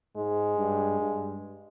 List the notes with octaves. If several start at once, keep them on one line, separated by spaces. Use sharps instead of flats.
G#2 G#3
G2
G2